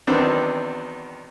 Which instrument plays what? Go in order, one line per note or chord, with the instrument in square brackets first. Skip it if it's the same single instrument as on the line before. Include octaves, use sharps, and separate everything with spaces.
[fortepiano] E2 D#3 F#3 B3 C4 D4